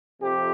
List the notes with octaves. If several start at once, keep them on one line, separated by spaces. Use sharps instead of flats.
F2 C3 F3 A3 C4 G4